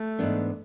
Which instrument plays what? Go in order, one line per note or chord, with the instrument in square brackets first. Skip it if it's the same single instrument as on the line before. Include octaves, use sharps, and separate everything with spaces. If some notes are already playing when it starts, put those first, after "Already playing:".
Already playing: [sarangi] A3
[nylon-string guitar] G#2 E3 B3 D4